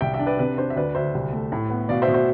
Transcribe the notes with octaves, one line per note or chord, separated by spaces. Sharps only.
C2 E5 G5
E5 G5
D4
B4 D5
C3 B4
D4 C5
E5
D2 B4 D5
D2 C5 E5
C2
A3
A2
B3
B2 D5 F5
C5 E5
B2
C5 E5